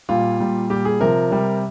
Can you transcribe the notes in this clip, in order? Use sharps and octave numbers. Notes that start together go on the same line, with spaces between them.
A#2 G3 F4
A#2 G3
A#2 G3 G4
G#4
C3 F3 A#4
C3 G3